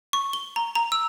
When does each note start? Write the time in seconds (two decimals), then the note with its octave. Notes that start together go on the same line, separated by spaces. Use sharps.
0.13 C#6
0.33 G7
0.56 A#5
0.75 A#5
0.92 E6